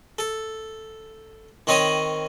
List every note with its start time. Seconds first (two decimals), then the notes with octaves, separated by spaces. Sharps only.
0.19 A4
1.67 D#3 C4 C#5 D#5 B5